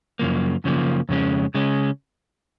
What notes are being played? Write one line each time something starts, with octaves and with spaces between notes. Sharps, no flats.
F#2 C#3 F3 A#3
F#2 C#3 F3 A#3
F2 C#3 G#3 C#4
C#3 G#3 C#4